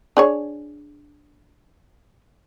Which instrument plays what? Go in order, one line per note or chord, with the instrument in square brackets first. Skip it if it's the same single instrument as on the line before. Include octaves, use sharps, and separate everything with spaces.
[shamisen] D4 G#4 C#5